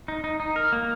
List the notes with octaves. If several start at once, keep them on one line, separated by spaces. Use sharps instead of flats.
D#4
D#4
D#4
A#4
A#3